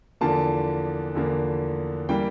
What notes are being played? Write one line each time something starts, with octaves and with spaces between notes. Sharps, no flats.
E2 D3 F3 A#3 A5
E2 D3 F3 A#3
E3 G3 A#3 G5